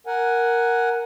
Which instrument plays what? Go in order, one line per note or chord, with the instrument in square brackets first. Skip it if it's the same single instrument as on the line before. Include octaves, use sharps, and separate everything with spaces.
[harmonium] A#4 F#5 G#5